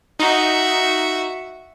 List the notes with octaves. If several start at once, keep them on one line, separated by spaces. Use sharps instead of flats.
D#4 F#4 E5